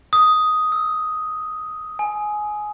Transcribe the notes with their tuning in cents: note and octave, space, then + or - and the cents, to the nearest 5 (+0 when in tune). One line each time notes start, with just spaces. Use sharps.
D#6 +5
E6 -10
G#5 +15